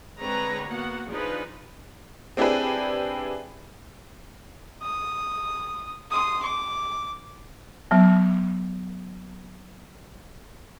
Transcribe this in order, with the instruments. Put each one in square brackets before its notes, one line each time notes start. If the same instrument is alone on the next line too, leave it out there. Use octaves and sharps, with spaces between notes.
[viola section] D3 G#3 C4 B4 C#5 A#5
A#3 B3 F#4 F#5
F3 D4 D#4 F4 G#4 B4
[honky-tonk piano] C4 D4 E4 G4 G#4 B4
[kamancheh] D#6
C6 D#6
D6
[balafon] F#3 B3